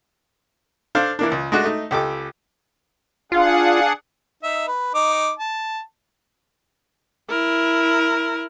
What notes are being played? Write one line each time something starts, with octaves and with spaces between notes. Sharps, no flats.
D4 A4 C5 F5
E3 A#3 D4
C#2
G#3 A3 D4 F#4
A3 D#4
C#2 G4 A4 D6
D4 F4 G#4 F5 F#5
D#4 E5
B4
D#4 D6
A5
E4 A#4